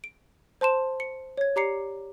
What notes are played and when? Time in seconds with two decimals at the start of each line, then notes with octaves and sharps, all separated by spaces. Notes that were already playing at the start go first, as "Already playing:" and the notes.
0.04 D7
0.61 C5 A5 C6 E7
1.00 C#7
1.37 C#5 G#6
1.56 G4 D5 A#5 D6 C7 C#7